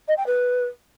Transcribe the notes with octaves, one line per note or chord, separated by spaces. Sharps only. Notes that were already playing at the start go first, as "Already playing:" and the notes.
D#5
G5
B4